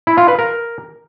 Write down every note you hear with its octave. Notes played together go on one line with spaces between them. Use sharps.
E4
F4
B4
A#4